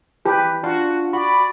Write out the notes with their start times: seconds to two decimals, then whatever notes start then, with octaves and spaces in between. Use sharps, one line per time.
0.25 E3 G4 B4
0.63 D4 F4 F#4 F5
1.13 F#4 D5 B5